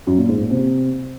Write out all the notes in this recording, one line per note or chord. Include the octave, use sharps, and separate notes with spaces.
F#2
A#2
G#2
A#2
C3